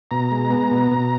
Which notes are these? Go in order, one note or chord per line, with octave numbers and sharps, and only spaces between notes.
B2 A#5
G#3
B3
B2
B2